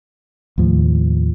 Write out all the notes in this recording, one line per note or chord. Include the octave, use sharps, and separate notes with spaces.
D#2 A2 F3